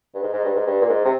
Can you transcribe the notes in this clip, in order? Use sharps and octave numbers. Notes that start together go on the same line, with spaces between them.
G2
G#2
G#2
G2
G#2
G2
A#2
G#2
C3